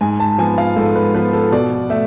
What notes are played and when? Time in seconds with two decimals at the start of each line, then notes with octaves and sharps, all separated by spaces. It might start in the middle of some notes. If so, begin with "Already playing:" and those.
0.01 G#2 G#5
0.20 A5
0.38 F3 B3 G#5
0.58 F5
0.76 G#2 A4
0.95 B4
1.14 F3 B3 B4
1.33 A4
1.52 B2 D5
1.90 A3 E5